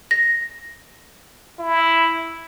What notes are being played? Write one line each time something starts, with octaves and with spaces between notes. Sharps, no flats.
A#6
E4